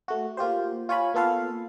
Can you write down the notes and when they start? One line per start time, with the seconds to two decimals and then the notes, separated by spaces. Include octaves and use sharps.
0.08 A3 F#4
0.37 A#3 F4 G4 C5
0.89 F4 C#5 G#5 B5
1.14 A#3 B3 F4 A4 B4 F5